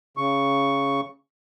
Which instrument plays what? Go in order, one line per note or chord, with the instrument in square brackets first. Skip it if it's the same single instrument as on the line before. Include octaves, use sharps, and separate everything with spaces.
[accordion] C#3 C#6